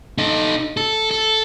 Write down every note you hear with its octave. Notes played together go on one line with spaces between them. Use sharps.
D#4 A4
A4
A4